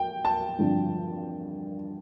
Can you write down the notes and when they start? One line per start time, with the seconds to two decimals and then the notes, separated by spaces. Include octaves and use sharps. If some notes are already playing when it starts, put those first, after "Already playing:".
Already playing: G5
0.25 A5
0.58 G2 D3 F3 C4